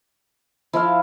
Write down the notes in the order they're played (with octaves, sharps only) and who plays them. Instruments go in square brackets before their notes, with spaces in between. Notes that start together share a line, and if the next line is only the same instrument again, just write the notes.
[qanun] F3 [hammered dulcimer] E4 F5